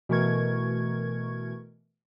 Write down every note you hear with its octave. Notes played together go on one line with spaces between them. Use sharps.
B2 E3 A3 A#4 C#6 G#6